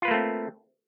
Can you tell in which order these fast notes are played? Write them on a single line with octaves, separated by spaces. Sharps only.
F4 B4 A#3 A3 C4